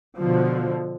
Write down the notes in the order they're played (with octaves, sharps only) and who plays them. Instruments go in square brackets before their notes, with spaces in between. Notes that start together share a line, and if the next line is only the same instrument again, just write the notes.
[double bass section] B2 D3 F3